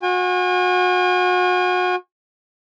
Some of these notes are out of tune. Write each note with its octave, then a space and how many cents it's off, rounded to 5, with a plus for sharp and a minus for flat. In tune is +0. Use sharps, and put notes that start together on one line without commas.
F#4 -35 G#5 -40